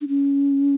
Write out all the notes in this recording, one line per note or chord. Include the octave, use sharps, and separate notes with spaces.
D4
C#4